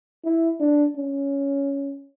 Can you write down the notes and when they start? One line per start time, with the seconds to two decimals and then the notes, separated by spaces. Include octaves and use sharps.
0.25 E4
0.60 D4
0.96 C#4